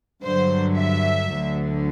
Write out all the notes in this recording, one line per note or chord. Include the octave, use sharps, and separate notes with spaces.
G2 D3 F#3 C5
E5
D2 D3 F#3